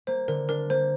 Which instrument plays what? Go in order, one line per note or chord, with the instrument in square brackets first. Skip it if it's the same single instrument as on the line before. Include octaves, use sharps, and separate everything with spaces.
[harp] A#3 [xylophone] C5
[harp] D3 [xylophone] A#4
[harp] D4 [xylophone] A#4
[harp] A#3 [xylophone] C5